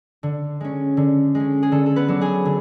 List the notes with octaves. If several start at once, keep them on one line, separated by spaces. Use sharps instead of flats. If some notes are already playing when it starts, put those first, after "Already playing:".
D3
G#3 C#4
D3
G#3 C#4
G#4
D3 A4
A4
B3 B4
F#3 B3 D4
G#4 G#5
D3